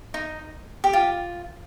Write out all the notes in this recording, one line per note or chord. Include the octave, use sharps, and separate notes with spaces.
D#4
G4
F4